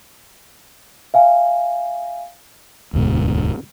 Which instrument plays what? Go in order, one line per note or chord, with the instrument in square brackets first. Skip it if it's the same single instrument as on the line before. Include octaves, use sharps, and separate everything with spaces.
[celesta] E5 F5 G#5
[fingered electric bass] E1 D2 G#2 B2